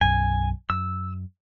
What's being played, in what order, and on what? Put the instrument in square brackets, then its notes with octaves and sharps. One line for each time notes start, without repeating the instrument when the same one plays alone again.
[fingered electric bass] B1 F#2 [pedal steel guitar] G#5
[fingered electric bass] F#2 [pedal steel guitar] E6